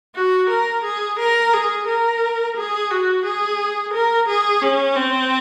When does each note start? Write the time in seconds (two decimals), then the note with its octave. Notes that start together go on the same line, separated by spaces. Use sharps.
0.15 F#4
0.49 A#4
0.84 G#4
1.19 A#4
1.53 G#4
1.87 A#4
2.56 G#4
2.91 F#4
3.25 G#4
3.93 A#4
4.28 G#4
4.62 C#4
4.96 C4